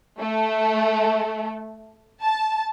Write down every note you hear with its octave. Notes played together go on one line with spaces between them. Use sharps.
A3
A5